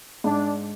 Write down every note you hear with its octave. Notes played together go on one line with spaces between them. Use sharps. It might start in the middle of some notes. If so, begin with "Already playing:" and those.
G#2 D4